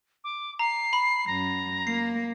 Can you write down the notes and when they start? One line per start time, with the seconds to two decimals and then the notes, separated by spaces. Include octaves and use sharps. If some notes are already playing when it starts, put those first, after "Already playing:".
0.24 D6
0.59 A#5 C7
0.93 B5
1.28 F#2 A#5
1.87 A#3 C7